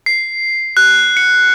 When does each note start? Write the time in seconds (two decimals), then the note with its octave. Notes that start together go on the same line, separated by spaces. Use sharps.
0.06 C7
0.77 F#6
1.17 C#7